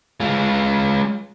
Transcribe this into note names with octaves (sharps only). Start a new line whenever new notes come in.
G#3 F4